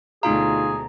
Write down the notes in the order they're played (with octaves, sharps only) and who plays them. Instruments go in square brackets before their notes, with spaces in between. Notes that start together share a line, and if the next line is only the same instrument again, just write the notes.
[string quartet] D2 B2 [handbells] D#4 F4 F5 [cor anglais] G#4 [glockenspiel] A#5